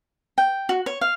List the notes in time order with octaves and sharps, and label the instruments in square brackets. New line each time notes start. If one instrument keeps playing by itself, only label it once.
[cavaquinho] G5
F#4
C#5
F5